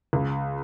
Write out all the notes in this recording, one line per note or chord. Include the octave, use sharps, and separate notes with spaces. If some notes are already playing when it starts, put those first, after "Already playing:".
C#2